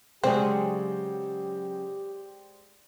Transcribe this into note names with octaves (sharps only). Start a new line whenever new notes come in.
C#3 F#3 G#3 C4 G4 G#4 C5 D5